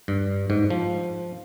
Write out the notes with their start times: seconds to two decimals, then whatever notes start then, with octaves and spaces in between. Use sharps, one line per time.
0.08 G2
0.50 G#2
0.70 F3